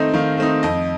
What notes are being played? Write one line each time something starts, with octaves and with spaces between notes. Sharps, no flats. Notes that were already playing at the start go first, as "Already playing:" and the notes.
Already playing: D#3 A3 C4 D#4 D#5
D#3 F5
A3 C4 D#4
F2 D#5